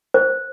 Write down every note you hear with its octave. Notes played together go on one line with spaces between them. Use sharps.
C5